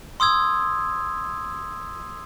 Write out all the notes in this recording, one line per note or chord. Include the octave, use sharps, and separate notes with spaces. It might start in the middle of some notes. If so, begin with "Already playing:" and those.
C6 D#6 E6 G#6